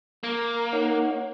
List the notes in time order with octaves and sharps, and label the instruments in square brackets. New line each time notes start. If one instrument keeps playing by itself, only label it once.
[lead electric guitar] A#3
[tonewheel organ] D#4 C#5 F#5